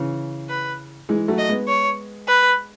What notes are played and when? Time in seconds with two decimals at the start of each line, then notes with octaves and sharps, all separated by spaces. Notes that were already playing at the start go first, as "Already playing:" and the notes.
Already playing: C#3 E3
0.49 B4
1.09 E3 G#3
1.28 F#3 A3
1.38 D#5
1.49 G#3 B3
1.68 C#5
2.28 B4